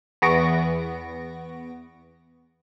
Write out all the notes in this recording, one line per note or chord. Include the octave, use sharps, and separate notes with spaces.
E2 E3 B3 C#6 A#6 D7